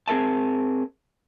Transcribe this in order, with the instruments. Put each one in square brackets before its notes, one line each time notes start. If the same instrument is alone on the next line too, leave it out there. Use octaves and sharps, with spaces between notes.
[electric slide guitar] C4 G#4 A#4 E5 A5